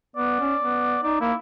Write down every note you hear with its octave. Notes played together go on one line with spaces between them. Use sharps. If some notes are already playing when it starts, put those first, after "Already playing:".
B3 D5
C#4
B3
D#4 D5
A#3 E4